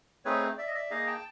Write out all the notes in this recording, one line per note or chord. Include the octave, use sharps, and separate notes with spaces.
A3 C4 D#4 G#4 B4 C#5
D5 E5
D#5
D5 E5
A#3 D#4 G#4 D#5 F5
G5 A5